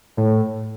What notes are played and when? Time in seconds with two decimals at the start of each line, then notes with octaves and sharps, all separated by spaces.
0.17 A2